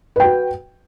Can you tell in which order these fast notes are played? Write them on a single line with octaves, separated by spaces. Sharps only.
B4 G5 F#4